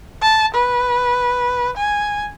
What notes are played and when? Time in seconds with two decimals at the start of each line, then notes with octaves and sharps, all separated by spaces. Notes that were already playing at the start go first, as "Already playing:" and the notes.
0.23 A5
0.55 B4
1.77 G#5